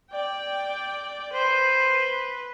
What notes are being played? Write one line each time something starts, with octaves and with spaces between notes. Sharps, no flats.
D5 G5
B4 C5